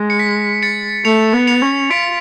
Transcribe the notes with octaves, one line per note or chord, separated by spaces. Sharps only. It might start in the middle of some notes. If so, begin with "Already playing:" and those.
Already playing: G#3
C#7
B6
A6 C#7
A3 C#7 F7
B3
C#7 F7
C#4
F4 B6 D7